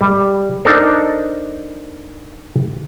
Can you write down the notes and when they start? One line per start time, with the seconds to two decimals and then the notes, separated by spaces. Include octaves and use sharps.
0.01 G3
0.65 D4 D#4 A4 A#4 C5